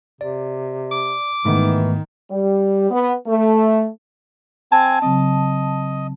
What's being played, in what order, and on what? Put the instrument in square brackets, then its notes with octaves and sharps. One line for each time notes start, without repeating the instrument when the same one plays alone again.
[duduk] C3 [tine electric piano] D5
[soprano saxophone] D6
[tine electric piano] G#2 A3 B3 [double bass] D#3 [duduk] E3
[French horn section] G3
B3
A3
[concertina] C4 G#5 [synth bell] A5
[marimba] C#3 F#3 C4 [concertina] D#5